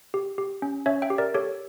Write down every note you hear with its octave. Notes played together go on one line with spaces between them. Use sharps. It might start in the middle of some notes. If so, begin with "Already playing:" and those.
G4
G4
C#4
C#4 C#5 E5
E5 G5
G4
A#4 D5
G4 A4 C#5